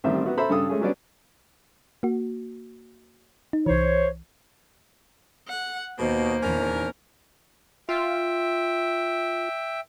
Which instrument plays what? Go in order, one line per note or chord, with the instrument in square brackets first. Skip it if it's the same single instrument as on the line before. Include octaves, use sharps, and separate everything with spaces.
[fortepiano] A1 D#3 G3 C4 E5
B3 F#4 E5
A4 C5 E5 A#5 B5
G2 C#3 A4 D#6
G#3 A3 C#4 G#4
F#3 G3 B3 C#4 D4 D5
[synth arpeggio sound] A#3 F#4
D#4
[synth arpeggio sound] C2 E3 [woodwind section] C5 C#5
[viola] F#5
[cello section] D#2 [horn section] B2 [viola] A#3 [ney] C5
[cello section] E2 A#2 D#3 [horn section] C#4 D4 A#4
[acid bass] F4 [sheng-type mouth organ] E5 G5